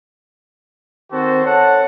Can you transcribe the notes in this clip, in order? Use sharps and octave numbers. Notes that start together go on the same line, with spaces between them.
D#3 C4 F#4 A4 C5
A4 C#5 F#5 A5